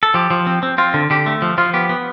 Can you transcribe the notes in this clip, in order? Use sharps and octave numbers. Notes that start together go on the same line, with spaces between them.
A4
F3 G4
F3
C4
C4
C4 F4
D3
D3 G4
A3
F3
F3 F4
B3 G4
B3